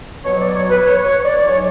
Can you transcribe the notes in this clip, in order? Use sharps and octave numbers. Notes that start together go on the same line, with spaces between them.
B2 F#3 C#5
D5
C#5
B4
C#5
C#5
D5
G#2 F#3 C#5